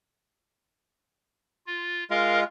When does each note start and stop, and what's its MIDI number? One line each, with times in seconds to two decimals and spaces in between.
1.66 2.04 65
2.10 2.44 56
2.10 2.44 65
2.10 2.40 70
2.10 2.40 75
2.10 2.40 77